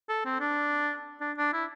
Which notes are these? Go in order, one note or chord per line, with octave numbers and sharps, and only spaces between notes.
A4
C4
D4
D4
D4
E4